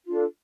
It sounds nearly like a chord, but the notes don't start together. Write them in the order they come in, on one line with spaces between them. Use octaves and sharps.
F4 D4 A4